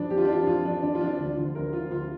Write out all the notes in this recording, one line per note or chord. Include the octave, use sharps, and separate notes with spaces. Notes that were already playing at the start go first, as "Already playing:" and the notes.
Already playing: F2 F3 D4
F2 G4
F4
D4
F3 F4
F2 F4
F3 D4
F2 D4
F4
F3 D4
D2 F4
D3 F3
D2 A#4
D3 F3 F4
D2 F4